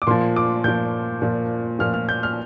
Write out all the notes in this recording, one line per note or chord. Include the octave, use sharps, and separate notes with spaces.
D6
A#2 F3 C6
D6
A#2 F3 G6
A#2 F3
A#2 F3 F6
F6
G6
F6